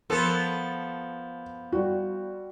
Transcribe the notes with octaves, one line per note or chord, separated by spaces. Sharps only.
F3 B3 A4 A#4
G3 F#4